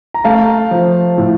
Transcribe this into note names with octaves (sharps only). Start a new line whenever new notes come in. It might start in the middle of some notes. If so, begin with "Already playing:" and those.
A#5
A3 F5 A5
F3
A2